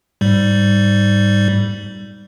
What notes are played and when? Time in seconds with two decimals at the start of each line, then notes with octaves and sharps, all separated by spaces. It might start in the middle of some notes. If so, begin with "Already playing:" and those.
0.21 G#2 G3